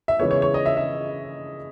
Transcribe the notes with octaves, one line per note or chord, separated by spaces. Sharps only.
E5
C#3 E3 G#3 B3 C#5
C#5
C#5
D#5
E5
E5